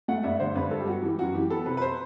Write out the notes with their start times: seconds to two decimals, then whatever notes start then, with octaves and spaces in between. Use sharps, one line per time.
0.08 A3 F#5
0.23 G2 E5
0.40 D3 C5
0.55 G2 B4
0.71 G3 A4
0.80 G4
0.87 B3 F#4
1.02 E3 G4
1.19 F#2 F#4
1.35 E3 G4
1.50 B3 A4
1.66 C3 B4
1.77 B4
1.82 C5